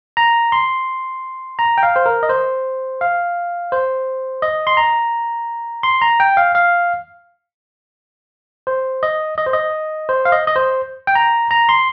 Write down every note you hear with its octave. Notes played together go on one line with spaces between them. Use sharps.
A#5
C6
A#5
G5
F5
C5
A#4
D#5
C5
F5
C5
D#5
C6
A#5
C6
A#5
G5
F5
F5
C5
D#5
D#5
C5
D#5
C5
F5
D#5
D#5
C5
G5
A#5
A#5
C6